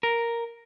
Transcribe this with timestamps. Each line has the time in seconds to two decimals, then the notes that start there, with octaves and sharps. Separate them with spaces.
0.03 A#4